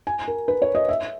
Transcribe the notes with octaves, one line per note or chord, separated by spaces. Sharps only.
G#5
A#4
B4
C#5
D#5
E5